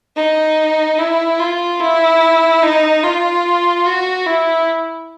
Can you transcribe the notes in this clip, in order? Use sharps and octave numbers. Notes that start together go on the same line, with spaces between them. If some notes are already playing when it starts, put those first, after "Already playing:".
D#4
E4
F4
E4
D#4
F4
F#4
E4